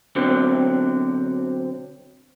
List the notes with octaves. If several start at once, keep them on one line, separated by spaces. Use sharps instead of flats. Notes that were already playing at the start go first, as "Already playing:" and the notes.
B2 D3 F#3 C4